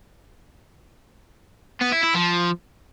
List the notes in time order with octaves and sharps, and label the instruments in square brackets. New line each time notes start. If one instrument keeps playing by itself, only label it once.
[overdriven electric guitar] B3
E4
E4
F3